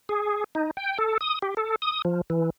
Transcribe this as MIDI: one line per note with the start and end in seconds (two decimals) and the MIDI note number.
0.09 0.44 68
0.55 0.71 63
0.77 0.98 79
0.98 1.18 69
1.21 1.39 87
1.42 1.55 67
1.57 1.76 69
1.82 2.02 87
2.05 2.21 53
2.30 2.50 52